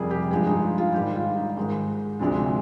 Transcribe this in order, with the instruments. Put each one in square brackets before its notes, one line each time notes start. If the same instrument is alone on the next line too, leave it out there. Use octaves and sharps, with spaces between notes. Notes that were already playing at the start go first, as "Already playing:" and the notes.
Already playing: [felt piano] F2 C3 G3 G#4 A#4
G4
G2 F3 G#3 G#4
D#4
F4
F4
G#2 D#3 G3 G4
F4
D#4
G#2 D#3 G#3
D2 C3 F3 G#3 D4